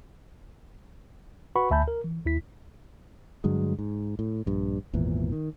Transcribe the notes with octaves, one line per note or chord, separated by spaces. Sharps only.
F#4 B4 F#5 B5 C#6
D2 E5 G#5 A5 B5 G6
A#4
E3
D#2 E4 B6
G2 D3 F#3 G#3
G#2
A2
A#1 G2
G#1 E2 A#2 E3
D#3